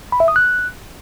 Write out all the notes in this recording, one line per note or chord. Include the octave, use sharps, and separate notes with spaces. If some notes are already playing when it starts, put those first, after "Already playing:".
B5
E5
D#6
F#6